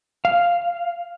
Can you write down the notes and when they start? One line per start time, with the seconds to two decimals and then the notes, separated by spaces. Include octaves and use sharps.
0.25 F5